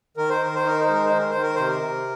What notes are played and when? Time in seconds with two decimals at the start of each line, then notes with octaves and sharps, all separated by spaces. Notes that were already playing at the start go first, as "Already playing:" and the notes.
0.17 D#3 A#4
0.30 C5
0.41 D#3 A#4
0.55 C5
0.65 D#4 A#4
0.80 C5
0.88 G#3
0.93 A#4
1.05 C5
1.11 D#3
1.18 A#4
1.30 C5
1.35 D#3
1.43 A#4
1.55 C3 C5
1.67 A#4
1.81 C3